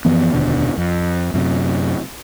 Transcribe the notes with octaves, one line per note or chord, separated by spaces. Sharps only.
F#2 E3 F3 B3
F1 D#2 B2 D3
F2
F#2 C3